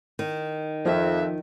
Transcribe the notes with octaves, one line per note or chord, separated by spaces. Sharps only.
D#3
F2 F3 E5